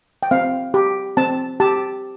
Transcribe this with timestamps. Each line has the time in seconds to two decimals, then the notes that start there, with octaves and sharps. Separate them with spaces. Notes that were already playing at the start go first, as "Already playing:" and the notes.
0.23 G5
0.31 C4 F5
0.74 G4
1.17 C4 A5
1.60 G4 A5